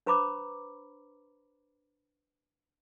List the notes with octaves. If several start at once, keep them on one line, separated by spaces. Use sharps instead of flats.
D4 B4 C5 A#5 B5 D6